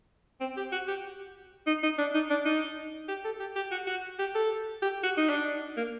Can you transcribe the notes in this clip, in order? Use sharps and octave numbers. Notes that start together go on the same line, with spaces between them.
C4
G4
F#4
G4
D#4
D#4
D4
D#4
D4
D#4
G4
A4
G4
G4
F#4
F#4
G4
A4
G4
F#4
D#4
D4
A#3